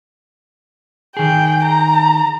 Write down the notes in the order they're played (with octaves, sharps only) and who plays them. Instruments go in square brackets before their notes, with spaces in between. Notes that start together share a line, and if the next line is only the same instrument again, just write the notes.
[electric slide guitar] D#3 G#4 [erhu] G5
[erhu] A#5